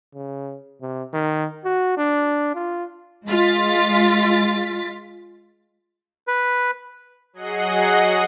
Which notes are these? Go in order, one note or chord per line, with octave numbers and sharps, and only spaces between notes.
C#3
C3
D#3
F#4
D4
F4
G#3 F4 A6 B6
B4
F#3 G#4 D#5 F#5 C7